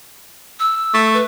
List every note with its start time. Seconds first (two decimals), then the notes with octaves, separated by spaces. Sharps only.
0.60 E6
0.94 A3
1.14 B4